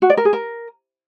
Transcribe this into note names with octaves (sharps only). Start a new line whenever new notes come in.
F#4
D5
A#4
G#4
A#4